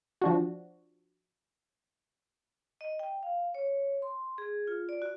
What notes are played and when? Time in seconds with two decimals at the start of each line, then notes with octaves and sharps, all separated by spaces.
0.21 F3 D4 F#4
2.81 D#5
2.99 G5
3.23 F5
3.55 C#5
4.02 C6
4.38 G#4
4.67 F4
4.89 D5
5.02 F#4